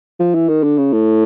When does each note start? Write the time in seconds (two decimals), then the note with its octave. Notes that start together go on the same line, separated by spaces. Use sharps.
0.20 F3
0.35 E3
0.49 D#3
0.63 D3
0.78 C#3
0.93 A2